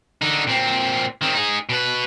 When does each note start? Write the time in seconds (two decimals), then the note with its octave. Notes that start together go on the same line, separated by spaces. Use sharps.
0.22 D3 D#4
0.47 A#2 C4
1.21 D#3 C4
1.34 D#4 G#4
1.69 B2 B4